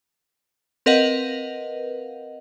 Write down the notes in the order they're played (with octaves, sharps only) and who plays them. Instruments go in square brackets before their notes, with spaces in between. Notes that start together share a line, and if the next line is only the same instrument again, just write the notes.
[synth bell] C4 A#4 B4 D#5 F5 F#5